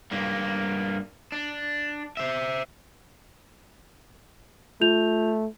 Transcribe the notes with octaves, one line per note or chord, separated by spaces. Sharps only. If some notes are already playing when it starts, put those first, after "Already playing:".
G2 A#3
D4
C5 E5
A3 F4 G6 F7